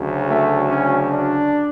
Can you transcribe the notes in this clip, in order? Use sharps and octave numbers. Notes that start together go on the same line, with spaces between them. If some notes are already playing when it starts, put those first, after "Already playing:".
Already playing: D2 C#3 F#3
A3
C#4
D4